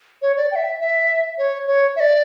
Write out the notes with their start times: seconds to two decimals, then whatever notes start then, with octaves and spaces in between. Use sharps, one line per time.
0.22 C#5
0.37 D5
0.51 G5
0.56 E5
0.80 E5
1.38 C#5
1.67 C#5
1.96 E5
2.00 D5